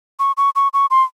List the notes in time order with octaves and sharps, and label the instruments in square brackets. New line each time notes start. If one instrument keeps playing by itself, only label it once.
[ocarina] C#6
C#6
C#6
C#6
C6